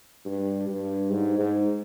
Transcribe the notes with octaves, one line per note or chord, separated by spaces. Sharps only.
G2
G2
G#2
G#2